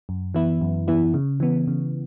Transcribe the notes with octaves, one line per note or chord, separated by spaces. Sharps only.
F#2
E3 B3 E4
F#2
E3 B3 E4
C#3
E3 B3
C#3